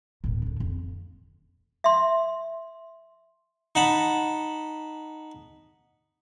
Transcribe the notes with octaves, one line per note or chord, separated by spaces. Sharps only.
D1 D#3
D3 D4
F2
E5 C6
D#4 F#5 A5 B5